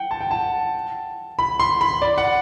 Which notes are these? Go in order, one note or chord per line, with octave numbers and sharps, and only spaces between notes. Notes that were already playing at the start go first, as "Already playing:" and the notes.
Already playing: F#5 G5
A5
G5
A5
B5
C6
B5
D5
F#5